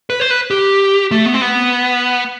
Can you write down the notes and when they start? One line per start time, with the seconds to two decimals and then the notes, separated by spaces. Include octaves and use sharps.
0.10 B4
0.20 C5
0.30 B4
0.51 G4
1.11 A3
1.26 B3
1.34 C4
1.41 B3